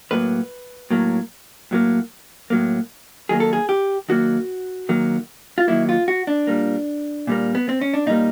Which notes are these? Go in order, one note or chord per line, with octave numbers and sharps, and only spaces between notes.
A2 F#3 A#3 B4
A2 F#3 A#3
A2 F#3 A#3
A2 F#3 A#3
D#3 F#3 A#3 G#4
A4
G#4
G4
D#3 F#3 A#3 F#4
D#3 F#3 A#3
F4
D#3 F#3 A#3 E4
F4
F#4
D4
A#2 G3 A#3
A#2 G3 A#3
B3
C4
C#4
D4
A#2 G3 A#3 D#4